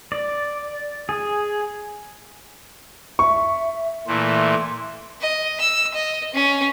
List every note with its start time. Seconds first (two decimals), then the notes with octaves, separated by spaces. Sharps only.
0.12 D5
1.09 G#4
3.19 E5 C#6
4.07 A#2 E3 A3 C6
5.21 D#5
5.60 E6
5.94 D#5
6.34 C#4